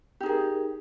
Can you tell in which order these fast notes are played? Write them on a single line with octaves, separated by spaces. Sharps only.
G4 D#4 G#4 A#4